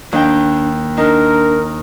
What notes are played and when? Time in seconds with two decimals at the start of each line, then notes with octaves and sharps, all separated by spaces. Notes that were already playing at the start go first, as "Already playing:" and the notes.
0.13 D#2 D4 G5
0.98 D4 D#4 A#4